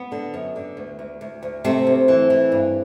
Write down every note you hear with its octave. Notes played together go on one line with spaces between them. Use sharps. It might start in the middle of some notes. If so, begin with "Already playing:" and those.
Already playing: B3
D3
F#2
D3
D2
D2
D2
D2
C3 A3 C4
D2
E3
E3
G2